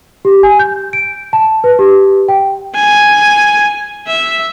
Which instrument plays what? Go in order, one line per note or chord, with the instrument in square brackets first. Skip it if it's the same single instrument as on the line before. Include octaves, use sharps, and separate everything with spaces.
[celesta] G4
G#5
G6
D7
A5
B4
G4
G5
[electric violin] G#5
E5